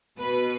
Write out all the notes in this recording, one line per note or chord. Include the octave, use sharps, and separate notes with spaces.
B2 B4